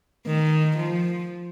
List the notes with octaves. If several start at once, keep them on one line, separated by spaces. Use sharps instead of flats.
D#3
F3